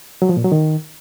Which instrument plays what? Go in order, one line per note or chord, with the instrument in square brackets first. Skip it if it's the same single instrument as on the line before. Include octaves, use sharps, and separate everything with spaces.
[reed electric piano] F#3
F3
A#2
F#3
D#3